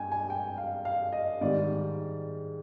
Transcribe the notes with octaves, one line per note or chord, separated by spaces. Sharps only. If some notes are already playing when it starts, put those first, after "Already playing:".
Already playing: G2 G5 G#5
G#5
G5
F5
F5
D#5
G#2 D#3 G3 D5